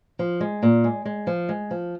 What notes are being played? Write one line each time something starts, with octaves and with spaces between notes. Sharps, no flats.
F3
G#3
A#2
G#3
G#3
F3
G#3
F3